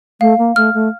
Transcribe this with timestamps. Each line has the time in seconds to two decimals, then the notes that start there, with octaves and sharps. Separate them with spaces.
0.21 A3 F5
0.38 A#3
0.56 A3 F6
0.74 A3